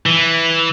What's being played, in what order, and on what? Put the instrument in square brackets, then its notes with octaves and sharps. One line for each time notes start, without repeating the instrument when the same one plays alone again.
[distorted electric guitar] E3